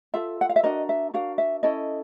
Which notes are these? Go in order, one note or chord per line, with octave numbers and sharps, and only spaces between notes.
F4 A4 E5
F#5
F5
E5
D4 F#4 A#4 D#5
E5
D4 F#4 A#4 F5
E5
C#4 E4 A4 D#5